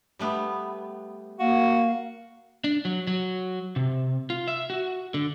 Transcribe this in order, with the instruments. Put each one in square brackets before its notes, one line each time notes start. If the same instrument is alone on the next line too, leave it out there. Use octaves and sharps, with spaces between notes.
[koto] G3 A3 B3
[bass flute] A#3 [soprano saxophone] F#4 [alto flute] F5
[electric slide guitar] D4
F#3
F#3
C3
F4
E5
F#4
D3